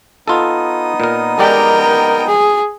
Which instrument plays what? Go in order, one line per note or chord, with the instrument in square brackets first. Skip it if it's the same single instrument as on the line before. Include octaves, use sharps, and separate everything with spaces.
[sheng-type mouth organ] B3 D#4 D#6 [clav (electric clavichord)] F4 A4
[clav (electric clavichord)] A#2 A#4
[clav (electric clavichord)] G#3 G4 D5 [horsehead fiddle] A#4 G5
[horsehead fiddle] G#4